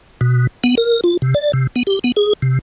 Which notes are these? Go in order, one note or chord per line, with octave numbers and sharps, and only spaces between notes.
B2
B3
A#4
F4
C3
D5
C3
B3
G4
B3
G#4
C3